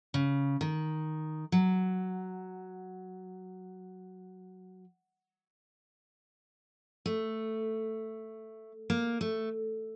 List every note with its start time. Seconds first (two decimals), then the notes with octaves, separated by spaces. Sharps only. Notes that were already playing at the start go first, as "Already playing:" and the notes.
0.14 C#3
0.61 D#3
1.52 F#3
7.06 A3
8.90 A#3
9.21 A3